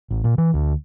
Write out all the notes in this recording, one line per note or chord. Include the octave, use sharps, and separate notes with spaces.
A1
A#2
E3
D2